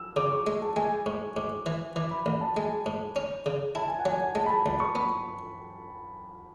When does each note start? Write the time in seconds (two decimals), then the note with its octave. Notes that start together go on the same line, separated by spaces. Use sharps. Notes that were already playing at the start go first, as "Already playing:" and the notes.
Already playing: E6
0.16 C#3 D6
0.32 C#6
0.47 G#3
0.62 A5
0.76 G#3 G#5
1.06 G#2 C#6
1.36 G#2 D6
1.66 E3
1.96 E3 D6
2.11 B5
2.26 A1 B5
2.41 A5
2.56 G#3 G#5
2.86 G#2
3.16 C#4
3.46 C#3
3.75 E4 A5
3.88 G#5
3.99 F#5
4.05 F#3 G#5
4.35 G#3 A5
4.46 B5
4.50 A5
4.66 C#2 B5
4.80 C#6
4.95 B3 B5